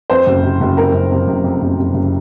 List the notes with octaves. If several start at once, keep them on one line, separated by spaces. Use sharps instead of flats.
F2 C5
F#1
C3
F#1
F2 A#4
F#1
C3
F#1
F2
F#1
C3
F#1